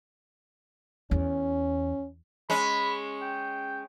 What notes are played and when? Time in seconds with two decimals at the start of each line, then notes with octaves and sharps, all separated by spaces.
1.11 E2 C#4
2.50 G#3 C#4 B5
3.22 G5